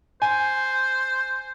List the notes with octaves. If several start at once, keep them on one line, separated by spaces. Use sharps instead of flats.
C5 G#5